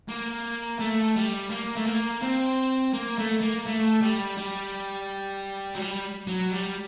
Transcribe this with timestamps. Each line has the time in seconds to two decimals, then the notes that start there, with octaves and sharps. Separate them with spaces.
0.08 A#3
0.79 A3
1.16 G3
1.51 A#3
1.77 A3
1.87 A#3
2.23 C4
2.94 A#3
3.18 A3
3.41 A#3
3.66 A3
4.01 G3
4.37 G3
5.75 F#3
5.79 G3
6.27 F#3
6.50 G3